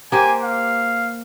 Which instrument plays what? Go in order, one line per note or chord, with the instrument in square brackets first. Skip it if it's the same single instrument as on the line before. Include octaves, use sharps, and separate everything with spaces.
[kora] A#3 G4 C5 [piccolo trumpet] G#5
[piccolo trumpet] F5